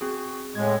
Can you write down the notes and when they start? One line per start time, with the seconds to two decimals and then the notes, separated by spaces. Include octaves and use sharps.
0.01 C4 F#4 G#4
0.55 A2 G#3 G#6